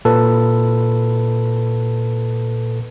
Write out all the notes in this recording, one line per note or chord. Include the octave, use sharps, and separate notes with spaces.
A#2 A4 B4